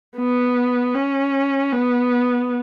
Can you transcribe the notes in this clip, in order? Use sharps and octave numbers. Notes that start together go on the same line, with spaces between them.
B3
C#4
B3